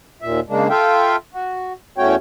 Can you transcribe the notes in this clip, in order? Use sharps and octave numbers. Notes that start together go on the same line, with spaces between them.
D#2 A#2 E5
C#3 G#3 A#3 D4
F4 A4 E5 F5 G5
F#4
E2 A3 C#4 F#4 C#5 G5